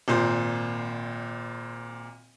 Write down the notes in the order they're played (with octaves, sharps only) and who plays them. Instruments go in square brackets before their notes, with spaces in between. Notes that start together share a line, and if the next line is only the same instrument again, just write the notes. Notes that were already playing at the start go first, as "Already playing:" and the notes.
[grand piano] G#1 A#2 C5